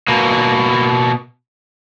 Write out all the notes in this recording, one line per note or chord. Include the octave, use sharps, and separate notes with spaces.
B2 A#3